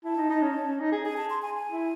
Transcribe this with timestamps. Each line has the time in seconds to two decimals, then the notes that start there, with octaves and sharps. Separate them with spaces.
0.04 E4 A5
0.17 D#4
0.29 D#4
0.42 C#4
0.67 C#4
0.80 D#4
0.92 G#4
1.05 G#4 G#5
1.17 A5
1.30 C6
1.42 G#5
1.55 G#5
1.72 E4